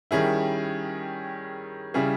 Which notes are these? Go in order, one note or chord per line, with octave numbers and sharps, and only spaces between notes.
D#3 G3 C#4 E4 G#4
C#3 G3 C#4 E4 G#4